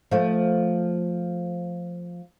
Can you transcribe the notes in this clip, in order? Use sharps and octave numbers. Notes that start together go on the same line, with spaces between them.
F3 A3